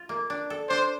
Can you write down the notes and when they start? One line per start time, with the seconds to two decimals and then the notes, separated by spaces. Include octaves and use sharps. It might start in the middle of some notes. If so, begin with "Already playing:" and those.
Already playing: F4
0.09 A#3
0.30 D4
0.50 A4
0.69 D4 C5